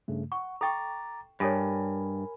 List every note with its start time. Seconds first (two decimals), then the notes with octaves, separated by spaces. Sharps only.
0.08 G2 C#3 A3
0.32 F#5 C#6
0.61 A4 G5 A#5 C#6 D6 A6
1.40 G2 G4 A4 A#4 C#5 G#5 B5